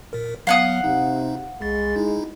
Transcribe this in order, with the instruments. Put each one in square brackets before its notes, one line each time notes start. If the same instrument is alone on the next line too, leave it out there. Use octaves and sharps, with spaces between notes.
[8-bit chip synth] A#2 A#4
[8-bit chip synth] F#3 B3 [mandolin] F5 F#5 D#6
[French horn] C3 [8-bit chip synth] D#4
[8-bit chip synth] C2 A6 [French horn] G#3
[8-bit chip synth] D#4 E4